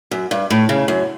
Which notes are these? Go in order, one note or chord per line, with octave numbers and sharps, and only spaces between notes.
F#2
G2
A2
C#3
F#2